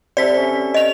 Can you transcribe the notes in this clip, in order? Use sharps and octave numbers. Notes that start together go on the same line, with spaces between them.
C3 A4 D5 B6
C#4
D#5 F7